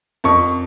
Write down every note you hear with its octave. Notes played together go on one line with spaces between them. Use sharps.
F2 C#6